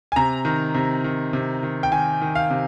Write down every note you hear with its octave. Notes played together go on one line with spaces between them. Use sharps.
G#5
C3 A#5
D#3
C3
D#3
C3
D#3
G5
D#3 G#5
D#3
F5
C3